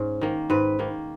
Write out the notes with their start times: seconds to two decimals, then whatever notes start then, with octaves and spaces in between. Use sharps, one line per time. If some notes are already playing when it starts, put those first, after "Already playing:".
Already playing: G#2 C#4
0.22 D#3 A#3
0.50 G#2 B4
0.79 D#3 A#3